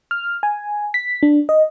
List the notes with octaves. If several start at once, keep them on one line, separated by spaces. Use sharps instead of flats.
F6
G#5
B6
D4
D#5